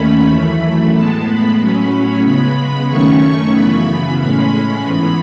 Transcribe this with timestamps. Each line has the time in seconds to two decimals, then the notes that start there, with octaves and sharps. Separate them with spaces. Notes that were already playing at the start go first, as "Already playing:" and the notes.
Already playing: D#2 D#3 A3 C#4 B5
0.29 F#2 E3 A3
0.93 A2 G#3 B3 A5
1.27 B5
1.58 A2 F#3 C#4 B5
2.23 C#3 G#3 B3 B5
2.89 F#2 D#3 A3 C#4 C#6
3.53 F#2 C#3 E3 B3 B5
4.20 A2 G#3 C#4 B5
4.83 G#2 E3 B3 B5